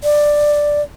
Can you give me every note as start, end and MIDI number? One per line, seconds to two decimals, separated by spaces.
0.04 0.82 74